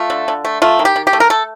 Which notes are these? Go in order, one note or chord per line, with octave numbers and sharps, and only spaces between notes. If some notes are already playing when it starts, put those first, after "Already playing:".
Already playing: A3 F4
D3
D3
A3
A3 F4
D#3
G4
D#3
G4
A3
A#4
A3 A4